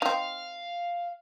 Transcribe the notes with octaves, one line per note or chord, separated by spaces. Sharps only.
C4 D#4 F5